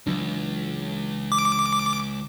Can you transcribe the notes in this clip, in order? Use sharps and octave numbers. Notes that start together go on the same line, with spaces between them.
C#2 E3 F#3 D4
D6